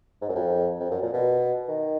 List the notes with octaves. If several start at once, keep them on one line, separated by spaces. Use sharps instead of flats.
G#2
F#2
F2
F2
F#2
A#2
B2
D#3